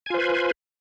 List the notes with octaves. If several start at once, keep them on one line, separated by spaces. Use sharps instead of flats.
F4 B4 C5 G#5